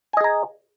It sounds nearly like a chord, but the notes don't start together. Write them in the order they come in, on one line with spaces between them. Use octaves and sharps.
G#5 D#5 G#4 A#5